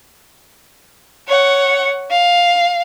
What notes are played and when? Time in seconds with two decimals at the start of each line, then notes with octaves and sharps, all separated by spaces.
1.28 C#5 F#5
2.11 F5